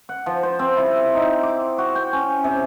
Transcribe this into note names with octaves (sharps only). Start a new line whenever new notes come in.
F#5
F3
C5
C4
E4
D#4
D6
F#4
G5
C#4
C3